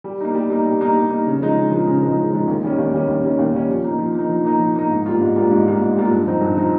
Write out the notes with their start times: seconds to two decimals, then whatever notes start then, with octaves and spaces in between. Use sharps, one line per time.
0.04 G3
0.21 A#3 D#4
0.35 G3
0.50 A#3 D#4
0.65 G3
0.81 A#3 D#4
0.96 G3
1.10 A#3 D#4
1.27 C#3
1.41 F3 G#3 D#4
1.56 C#3
1.72 F3 G#3 D#4
1.87 C#3
2.03 F3 G#3 D#4
2.17 C#3
2.33 F3 G#3 D#4
2.48 D#2
2.63 D#3 G3 C#4
2.78 D#2
2.94 D#3 G3 C#4
3.08 D#2
3.24 D#3 G3 C#4
3.39 D#2
3.54 D#3 G3 C#4
3.69 F3
3.84 A#3 D#4
3.99 F3
4.15 A#3 D#4
4.29 F3
4.45 A#3 D#4
4.59 F3
4.76 A#3 D#4
4.90 G#2
5.06 G3 A#3 F4
5.21 G#2
5.36 G3 A#3 F4
5.51 G#2
5.65 G3 A#3 F4
5.81 G#2
5.97 G3 A#3 F4
6.11 G2
6.27 F3 C4 D#4
6.41 G2
6.57 F3 C4 D#4